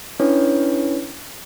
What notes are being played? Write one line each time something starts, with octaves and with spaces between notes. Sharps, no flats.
C#4 D4 E4 B4 C#5